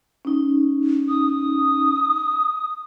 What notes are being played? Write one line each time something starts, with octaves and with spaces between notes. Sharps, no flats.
C#4 D#4
D#6